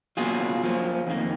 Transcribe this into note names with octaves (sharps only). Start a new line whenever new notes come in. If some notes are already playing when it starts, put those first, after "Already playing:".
B2 F#3 A#3 C#4 F4 G#4
F#2 F3 A#3 C#4
F2 D#3 A#3